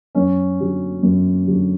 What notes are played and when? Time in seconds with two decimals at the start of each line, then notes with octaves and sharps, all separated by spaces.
0.15 F#2 C#4
0.60 D3 F#3
1.03 F#2
1.48 D3 F#3